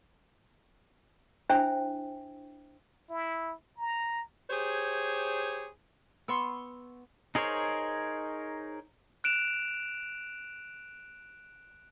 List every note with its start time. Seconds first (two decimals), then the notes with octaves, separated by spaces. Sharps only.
1.49 D4 E4 C5 E5 G5 G#5
3.10 E4
3.77 A#5
4.50 G4 G#4 C5 C#5
6.28 B3 C6 C#6 E6
7.35 D#4 G#4 A#4 C5 C#5
9.24 F#6 D7 E7 F7